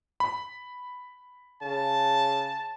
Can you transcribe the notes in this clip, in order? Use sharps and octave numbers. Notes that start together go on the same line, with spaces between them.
B5
C#3 A5